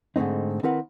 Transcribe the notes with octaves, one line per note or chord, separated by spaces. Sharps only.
G#2 D3 A3 C4 D#4
D#3 C4 E4 A#4 B4 F#5